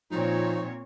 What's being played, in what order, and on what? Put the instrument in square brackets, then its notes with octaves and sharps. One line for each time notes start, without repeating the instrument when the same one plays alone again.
[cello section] A#2 C4 C#5 [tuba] F3 [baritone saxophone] D#4